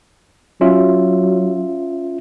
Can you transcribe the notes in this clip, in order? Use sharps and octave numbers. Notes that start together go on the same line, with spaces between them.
F#3 C#4 F4 E5